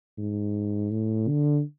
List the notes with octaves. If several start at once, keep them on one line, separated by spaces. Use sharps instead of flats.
G#2
A2
D3